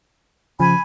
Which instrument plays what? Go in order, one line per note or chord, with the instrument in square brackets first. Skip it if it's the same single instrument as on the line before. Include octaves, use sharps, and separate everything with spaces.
[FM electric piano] C#3 F3 [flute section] G#5 B5